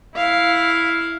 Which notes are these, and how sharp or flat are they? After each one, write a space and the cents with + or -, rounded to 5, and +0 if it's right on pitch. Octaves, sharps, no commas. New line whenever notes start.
E4 +0 F5 +0